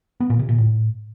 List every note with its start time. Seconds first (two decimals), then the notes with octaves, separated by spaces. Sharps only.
0.20 B3
0.30 A#2
0.39 C3
0.49 A#2
0.58 A2